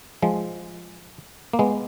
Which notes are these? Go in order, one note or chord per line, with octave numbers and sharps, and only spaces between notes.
F3 G#3
A#3
G#3 B3